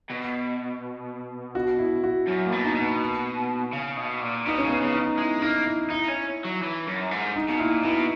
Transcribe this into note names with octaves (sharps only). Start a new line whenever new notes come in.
B2
F#4
E4
F#4
F#2
A#3
B2
D#4
B2
B3
C#3
B2
A#2
B2 D#4
C#4
C#3
B3
C#3
D#4
G#3 E4
A#3 D#4
E4
D#4 E4
C#4
F#3
E3
F#2
G#2
D#4
B2
A#2 E4
B2 E4